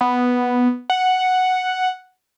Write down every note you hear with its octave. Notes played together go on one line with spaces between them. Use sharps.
B3
F#5